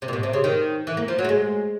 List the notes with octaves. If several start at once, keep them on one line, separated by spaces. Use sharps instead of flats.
C3
A#2
B2
C3
C#3
D#3
E3
A#3
F3
F#3
A3
G#3